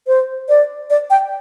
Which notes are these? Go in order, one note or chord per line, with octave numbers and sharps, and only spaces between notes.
C5
D5
D5
G5